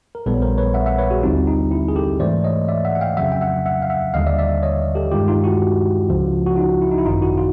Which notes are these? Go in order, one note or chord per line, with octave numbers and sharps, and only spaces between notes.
A#4
A#1 A#2 G3 B3 A4 B4
C#5
A#4 C5
B4 C#5
E5 F#5
E5 F#5
B4 C#5
F#4 G#4
D#2 D3 G3 C4 D#4 F4 G4
D#4
E4
G#4
G4 A4
G#2 E3 A3 C5 D5
C#5 D#5
D5 E5
E5 F#5
F#5
F5 G5
F2 C#3 F#3 E5 F#5
G5
E5 F#5
E5 F#5
F5
E5 F#5
D#2 D3 G3 D#5 F5
D5 E5
D5 E5
C#5 D#5
G4 A4
G2 D#3 G#3 F4 G4
D#4 F4
E4 F#4
C#2 C#3 F3
F#4
D#4 F4
E4
D#4
E4
G#1 F#2 D#3 D#4 F4
E4 F#4
F4